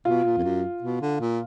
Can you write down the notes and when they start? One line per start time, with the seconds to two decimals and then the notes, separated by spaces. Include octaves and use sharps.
0.05 B2 F4
0.24 A#2
0.37 F2
0.43 F#2
0.82 B2
1.02 D3
1.20 A#2